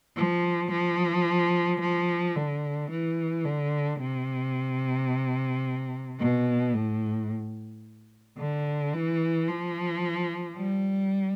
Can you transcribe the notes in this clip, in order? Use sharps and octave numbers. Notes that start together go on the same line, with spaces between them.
F3
F3
F3
D3
E3
D3
C3
B2
A2
D3
E3
F3
G3